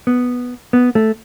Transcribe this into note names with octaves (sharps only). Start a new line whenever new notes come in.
B3
B3
A3